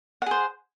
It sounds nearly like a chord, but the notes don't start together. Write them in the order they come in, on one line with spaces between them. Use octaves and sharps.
F#5 G#4 C5